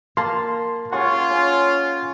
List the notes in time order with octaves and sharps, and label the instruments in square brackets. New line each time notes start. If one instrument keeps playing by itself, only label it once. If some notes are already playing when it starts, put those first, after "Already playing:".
[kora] A#3 [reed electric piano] A5 C6
[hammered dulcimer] C#4 G#4 C#5 [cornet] F4 [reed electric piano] F#5 C6 C#6
[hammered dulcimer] C#4